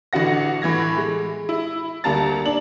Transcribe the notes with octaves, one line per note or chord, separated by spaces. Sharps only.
A1 D3 F#4 F#5 A#6
A2 E3 G#6 A#6
G#3
E4
D2 G3 A#3 A5 A#5 A6
D4 F#7